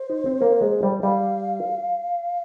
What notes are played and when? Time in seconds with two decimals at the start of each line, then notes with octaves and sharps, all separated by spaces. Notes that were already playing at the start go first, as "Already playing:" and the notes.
Already playing: C5
0.10 D#4
0.26 C4
0.42 A#3
0.61 G#3
0.83 G3
1.03 G3 F5